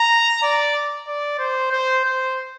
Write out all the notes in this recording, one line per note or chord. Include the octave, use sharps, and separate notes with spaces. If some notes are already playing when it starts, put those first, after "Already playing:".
Already playing: A#5
D5
D5
C5
C5
C5